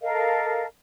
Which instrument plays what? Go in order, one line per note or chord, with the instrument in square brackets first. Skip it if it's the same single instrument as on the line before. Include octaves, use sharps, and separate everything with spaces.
[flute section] A4 A#4 D#5 F5